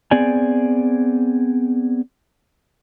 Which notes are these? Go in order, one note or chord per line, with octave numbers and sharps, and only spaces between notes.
B3 C4 G#4 D5 G#5